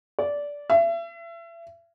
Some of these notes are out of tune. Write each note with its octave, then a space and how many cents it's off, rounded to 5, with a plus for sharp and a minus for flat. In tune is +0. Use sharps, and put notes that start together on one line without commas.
D5 -15
E5 +35